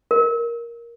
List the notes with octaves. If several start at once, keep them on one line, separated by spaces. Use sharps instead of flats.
A#4